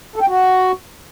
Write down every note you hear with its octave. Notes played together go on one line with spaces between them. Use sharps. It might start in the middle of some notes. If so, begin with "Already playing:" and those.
A4
G5
F#4